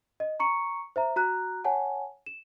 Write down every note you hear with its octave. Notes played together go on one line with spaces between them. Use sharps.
D#5
A#5 C#6 C#7
C5 E5 A#5
F#4 A#5 F#6
C#5 F#5 G#5 A5
E7